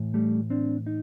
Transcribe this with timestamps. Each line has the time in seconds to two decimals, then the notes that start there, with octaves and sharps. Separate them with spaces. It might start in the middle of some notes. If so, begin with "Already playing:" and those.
Already playing: A2 E3
0.14 G3 A3
0.50 C4 D4
0.86 D#4